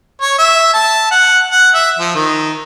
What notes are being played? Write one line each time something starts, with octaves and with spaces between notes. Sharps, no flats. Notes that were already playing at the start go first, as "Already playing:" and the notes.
C#5
E5
A5
F#5
F#5
E5
F3
D#3